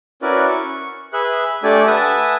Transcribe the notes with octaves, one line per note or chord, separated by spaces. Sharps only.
C#4 E4 F#4 A#4 B4 D5
C#6
G#4 B4 E5 F#6
A3 D4 G4 A4 D5 G#5
B4 E5 F#5 G#5 A5 D#6